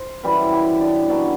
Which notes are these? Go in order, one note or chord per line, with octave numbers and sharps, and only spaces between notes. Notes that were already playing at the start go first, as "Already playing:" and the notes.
Already playing: C5
F#2 E3 G3 B4
G4
D4
B2 F#3 D4